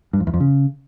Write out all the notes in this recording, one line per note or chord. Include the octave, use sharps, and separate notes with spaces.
G2
F2
E2
F2
C#3